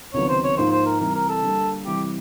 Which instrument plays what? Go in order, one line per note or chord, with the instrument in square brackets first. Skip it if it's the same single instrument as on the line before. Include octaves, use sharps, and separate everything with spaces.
[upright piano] C#2 C3 D#3 F#3 B3 [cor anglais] C#5
[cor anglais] C5
C#5
[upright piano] G#2 F3 A#3 D#4 [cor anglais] C5
[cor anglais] C5
A#4
[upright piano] C3 E3 G3 [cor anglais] A#4
[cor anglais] A#4
A4
[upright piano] D3 G3 A#3
[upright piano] C3 E3 G3 [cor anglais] G4